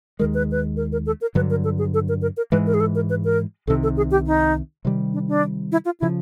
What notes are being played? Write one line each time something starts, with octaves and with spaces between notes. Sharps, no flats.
D#2 D#3 G#3 A#4
B4
B4
A#4
A#4
A4
A#4
G2 D3 F#3 B4
A#4
A4
G#4
A4
A#4
A#4
A#4
G#2 E3 G#3 B4
A#4
G#4
A4
A#4
B4
A#4
C2 C3 D#3 A4
A4
G#4
G4
D#4
C3 D#3 G3
D4
D4
E4
F4
C#3 F3 E4